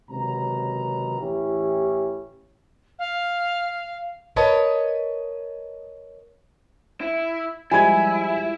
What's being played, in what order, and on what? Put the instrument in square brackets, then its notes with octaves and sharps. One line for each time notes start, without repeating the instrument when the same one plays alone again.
[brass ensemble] C#2 C3 D#3 F#3 B4 A#5
A1 E3 C#4 E4 G4
[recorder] F5
[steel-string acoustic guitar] A#4 B4 C#5 D#5 A5
[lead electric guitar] E4
[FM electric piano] F3 G3 G#3 [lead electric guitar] E4 [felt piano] G#5 B5 G#6